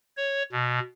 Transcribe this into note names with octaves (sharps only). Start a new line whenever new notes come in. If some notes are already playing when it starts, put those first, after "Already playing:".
C#5
B2